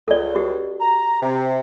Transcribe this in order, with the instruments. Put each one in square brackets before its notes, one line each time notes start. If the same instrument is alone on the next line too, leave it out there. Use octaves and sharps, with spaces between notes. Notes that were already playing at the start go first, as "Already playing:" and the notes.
[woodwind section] C#2 [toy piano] A4 D5
[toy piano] F#4 G4
[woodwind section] A#5
C3